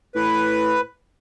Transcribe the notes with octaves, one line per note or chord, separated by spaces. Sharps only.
A2 B4